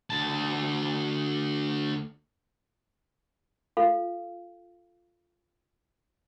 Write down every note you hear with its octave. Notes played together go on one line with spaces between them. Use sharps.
D2 A5
F4 A4 F5